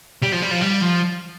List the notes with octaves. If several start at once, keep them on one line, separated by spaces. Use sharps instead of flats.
G3
F3
G3
F3
G3
F3